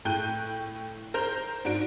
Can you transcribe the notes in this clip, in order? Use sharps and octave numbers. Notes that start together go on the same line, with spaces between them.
A2 G5 F#6 G6 D#7
A#4 C5 G6 F7
G#2 D4 F#4 D7